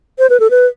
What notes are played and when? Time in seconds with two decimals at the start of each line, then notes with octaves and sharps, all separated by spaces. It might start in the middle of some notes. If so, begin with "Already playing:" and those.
0.19 C5
0.30 B4
0.40 A4
0.50 B4